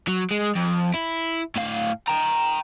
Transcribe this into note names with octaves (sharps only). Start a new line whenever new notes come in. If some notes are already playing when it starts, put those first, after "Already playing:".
F#3
G#3
F2
E4
A2 F5
G5 A#5